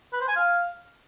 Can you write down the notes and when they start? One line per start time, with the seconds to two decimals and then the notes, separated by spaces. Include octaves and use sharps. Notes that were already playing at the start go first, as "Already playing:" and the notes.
0.13 B4
0.21 C5
0.28 G#5
0.36 F5